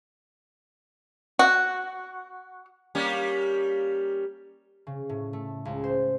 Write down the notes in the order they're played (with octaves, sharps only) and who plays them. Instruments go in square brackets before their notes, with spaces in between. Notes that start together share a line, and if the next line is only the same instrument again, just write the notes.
[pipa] F#4
[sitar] G3 A#3 C#4
[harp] C#3
A2
A3
C#2
C5